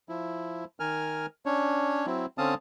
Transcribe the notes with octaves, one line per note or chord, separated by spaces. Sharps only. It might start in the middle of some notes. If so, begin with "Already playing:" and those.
F3 E4
D#3 A#4 G#5 F6
C#4 D4 C#5
F#3 C4 E4
D3 C4 C#4 F5 A5 D#6